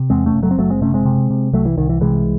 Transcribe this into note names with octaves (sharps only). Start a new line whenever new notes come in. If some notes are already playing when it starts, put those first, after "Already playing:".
Already playing: C3
E2 G#3 C4
A3 C#4
F#1
F#3 A3
C4
F#1 F#3 A3
G#3 C4
C3 A3 C#4
G#3 C4
C3
C3
C2 F#3 A3
E3
C2 D#3
E3
C3 E3 G#3